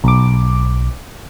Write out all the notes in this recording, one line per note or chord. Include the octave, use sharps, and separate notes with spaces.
B1 D6